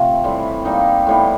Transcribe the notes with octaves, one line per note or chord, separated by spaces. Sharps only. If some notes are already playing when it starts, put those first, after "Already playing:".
Already playing: C3 F3 A3
A2 E3 G3 C4
G3 A#3 D#4
A2 E3 G3 B3